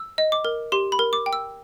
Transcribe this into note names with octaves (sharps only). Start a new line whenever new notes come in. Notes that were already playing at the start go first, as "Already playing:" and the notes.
Already playing: E6
D#5
D6
A#4
G4 C6
B5
A#4
D6
G5
E6